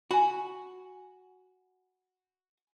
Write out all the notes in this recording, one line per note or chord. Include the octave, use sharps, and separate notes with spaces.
F#4 G#5 B5